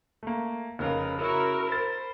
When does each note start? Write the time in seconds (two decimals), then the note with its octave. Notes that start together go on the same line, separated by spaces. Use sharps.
0.23 A3 A#3
0.79 F1 C#3 A#4 B4 F5
1.19 C#3 E4 F#4 A#4
1.68 C5 B5 A6